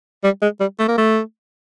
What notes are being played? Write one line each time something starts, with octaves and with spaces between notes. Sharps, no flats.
G3
G#3
G3
A3
A#3
A3